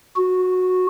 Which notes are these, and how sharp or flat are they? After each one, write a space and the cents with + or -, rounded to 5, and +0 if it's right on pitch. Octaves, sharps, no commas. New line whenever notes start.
F#4 -10